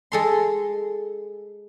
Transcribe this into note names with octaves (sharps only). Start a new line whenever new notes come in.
G#3 A4 C6